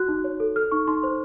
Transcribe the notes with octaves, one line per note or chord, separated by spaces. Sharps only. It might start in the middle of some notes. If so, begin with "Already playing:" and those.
Already playing: F#4 F#6
D#4
C#5
A4
A4 F6
D#4 C#6
D#4 C6
C5